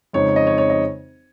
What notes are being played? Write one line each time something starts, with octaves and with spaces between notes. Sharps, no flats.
F2 C#3 G#3 D#4 C#5
D#5
C#5
C#5
D#5